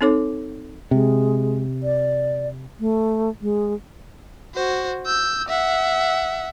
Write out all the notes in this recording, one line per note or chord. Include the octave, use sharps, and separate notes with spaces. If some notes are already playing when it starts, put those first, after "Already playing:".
C4 D#4 A4 C#5 D6
C3 G#3
D5
A3
G#3
F#4 C5
E6 G6
E5 F#5